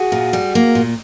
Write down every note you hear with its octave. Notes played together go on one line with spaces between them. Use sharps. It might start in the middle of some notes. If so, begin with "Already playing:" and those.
Already playing: F#4 G#4
A#2
G3
A#3
A#2